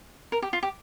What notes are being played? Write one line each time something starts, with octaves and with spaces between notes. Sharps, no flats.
A#4
G4
F4
G4